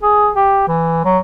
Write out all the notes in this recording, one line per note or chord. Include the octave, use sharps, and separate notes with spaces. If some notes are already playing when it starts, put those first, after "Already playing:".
G#4
G4
E3
F#3